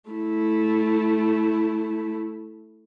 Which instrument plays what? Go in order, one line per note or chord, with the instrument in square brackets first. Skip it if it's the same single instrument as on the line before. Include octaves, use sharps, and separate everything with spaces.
[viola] A3 E4